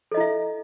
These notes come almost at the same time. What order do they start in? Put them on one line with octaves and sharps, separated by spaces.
A4 D#5 E4 E5